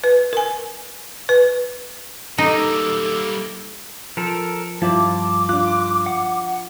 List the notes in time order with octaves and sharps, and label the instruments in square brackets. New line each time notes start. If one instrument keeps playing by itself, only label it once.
[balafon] B4
A#4 G#5
B4
[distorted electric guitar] G3 A#3 [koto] D#4 [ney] A4
[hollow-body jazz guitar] F3 [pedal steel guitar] A4 A#4
[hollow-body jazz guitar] G2 E4 [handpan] F3 F4 [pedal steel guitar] A5 [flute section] D6
[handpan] D4 F4 [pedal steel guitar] F#6
[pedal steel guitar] F#5